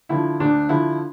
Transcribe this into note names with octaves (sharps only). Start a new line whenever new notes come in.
D3 F3 E4
D2 D4
D3 F3 E4